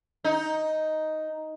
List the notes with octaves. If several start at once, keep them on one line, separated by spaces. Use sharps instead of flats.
D#4